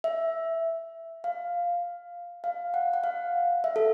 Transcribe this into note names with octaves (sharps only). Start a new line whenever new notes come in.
E5
F5
F5
F#5
F#5
F5
E5
A4